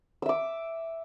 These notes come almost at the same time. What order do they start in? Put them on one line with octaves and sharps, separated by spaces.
E6 E5 D6